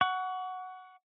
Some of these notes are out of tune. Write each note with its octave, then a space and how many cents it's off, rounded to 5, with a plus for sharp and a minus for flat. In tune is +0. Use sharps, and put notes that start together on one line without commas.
F#5 +0 C#6 +25